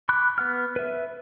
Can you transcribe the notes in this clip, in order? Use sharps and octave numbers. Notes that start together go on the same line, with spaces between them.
B5 C#6 D6 F#6
B3 F#5 F6
B4 E5